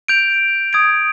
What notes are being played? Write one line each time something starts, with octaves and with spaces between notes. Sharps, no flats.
G6 D7 F7
D#6 G#6 D7